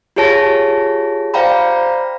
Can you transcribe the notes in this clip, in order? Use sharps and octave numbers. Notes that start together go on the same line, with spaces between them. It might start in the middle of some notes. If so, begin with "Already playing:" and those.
F4 G4 G#4 C#5 A5 A#6
C5 D5 F5 G5 A#5 B5